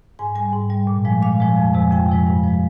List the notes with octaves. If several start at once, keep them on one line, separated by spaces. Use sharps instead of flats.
G#2 G#5
G3 G#5
G#2
G3
A#2
F3 G#3
A#2 F5
F3 G#3
F2
C3 F3 G#3
F2 G5
C3 F3 G#3
G2
F3 G#3